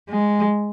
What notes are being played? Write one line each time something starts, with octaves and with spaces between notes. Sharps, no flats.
G#3